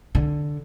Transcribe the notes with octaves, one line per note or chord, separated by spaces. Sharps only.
D3